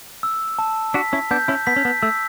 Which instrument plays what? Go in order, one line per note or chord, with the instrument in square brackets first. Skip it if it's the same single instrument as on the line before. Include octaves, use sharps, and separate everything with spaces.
[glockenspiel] E6
A5
[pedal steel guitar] D4 F#4 [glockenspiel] B6
[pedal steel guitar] C#4 E4
[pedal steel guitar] B3 D4 [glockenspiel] G6
[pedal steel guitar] C#4 E4
[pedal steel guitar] B3 [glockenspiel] B6
[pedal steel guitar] C#4
B3
[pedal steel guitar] A3 [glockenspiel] E6